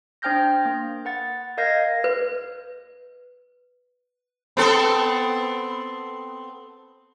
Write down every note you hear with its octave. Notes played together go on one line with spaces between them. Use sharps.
D4 C5 G5 F6 G6 A#6
A#3
B4 F#5 A6
A#4 D#5 F5 G6 G#6 A#6
B4
B3 C4 A4